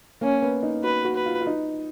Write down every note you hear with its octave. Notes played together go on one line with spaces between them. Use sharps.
A#3 C#4
B3
D#4
F#4 B4
F#4
B4
F4
F4
D#4